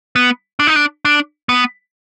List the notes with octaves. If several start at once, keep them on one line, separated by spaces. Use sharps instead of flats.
B3
D4
D#4
D4
D4
B3